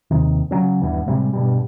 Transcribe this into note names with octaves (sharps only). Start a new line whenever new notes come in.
D#2 C3 D#3
C#3 F3 F#3 C#4
D#1 G2 E3 B3
A2 C3 G3 G#3
G2 B2 G3